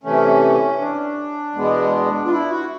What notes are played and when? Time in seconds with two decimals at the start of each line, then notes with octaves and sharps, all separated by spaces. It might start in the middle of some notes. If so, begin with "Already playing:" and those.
0.03 C3 E3 A3 C#4
0.80 D4
1.55 E2 B2 G#3 B3
2.26 F4
2.31 E4
2.50 F#4